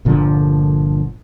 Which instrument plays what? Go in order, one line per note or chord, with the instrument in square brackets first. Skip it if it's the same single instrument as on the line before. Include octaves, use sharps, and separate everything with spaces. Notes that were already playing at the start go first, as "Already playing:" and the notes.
[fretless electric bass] G1 A#2 D3 F3